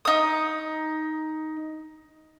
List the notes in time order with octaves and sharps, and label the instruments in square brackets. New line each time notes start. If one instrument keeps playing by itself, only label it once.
[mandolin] D#4 D#6